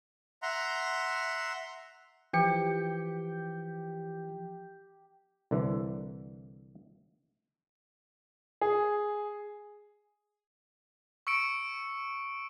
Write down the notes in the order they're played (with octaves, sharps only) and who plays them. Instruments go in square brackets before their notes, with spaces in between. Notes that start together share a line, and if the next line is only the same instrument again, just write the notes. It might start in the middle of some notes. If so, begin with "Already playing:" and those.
[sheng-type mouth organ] E5 F#5 A#5 C6
[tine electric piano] E3 F3 C#7 [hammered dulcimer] G4
[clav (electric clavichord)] C2 D3 E3
[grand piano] G#4
[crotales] C#6 E6 C#7 D7